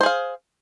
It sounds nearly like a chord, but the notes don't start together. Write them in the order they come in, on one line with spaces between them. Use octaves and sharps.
C5 G#4 F5